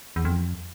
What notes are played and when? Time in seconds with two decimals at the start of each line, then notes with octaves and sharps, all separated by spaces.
0.16 E2
0.25 F2